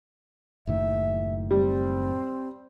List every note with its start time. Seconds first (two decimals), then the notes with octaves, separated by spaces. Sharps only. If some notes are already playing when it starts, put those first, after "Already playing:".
0.67 F#1 A2 D#3 E5
1.51 G3 C4